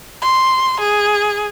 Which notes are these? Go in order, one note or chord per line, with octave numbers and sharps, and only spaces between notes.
C6
G#4